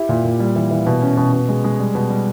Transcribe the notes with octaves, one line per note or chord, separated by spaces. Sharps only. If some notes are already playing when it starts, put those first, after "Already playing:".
Already playing: E4 G4
A#2
A#2
G3
E3
E3
B2
C#4
B2
B2
G#3
G#3
G3
B2
G3